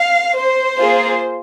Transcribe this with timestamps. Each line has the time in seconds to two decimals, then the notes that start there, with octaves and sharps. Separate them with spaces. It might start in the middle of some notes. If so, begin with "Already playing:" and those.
Already playing: F5
0.35 C5
0.78 A#3 F4 G#4